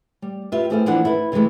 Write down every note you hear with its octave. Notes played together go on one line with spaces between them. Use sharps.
G3
F4 G4 B4 E5
A2 C4 G#4 A4 D5 F5
E3 F3 A#3 D4 F#5
E4 A4 B4
C3 E3 F#3 G#3 A3